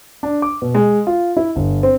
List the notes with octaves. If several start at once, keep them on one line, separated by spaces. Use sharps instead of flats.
D4
D6
B2
G#3
F4
E4
G1
C4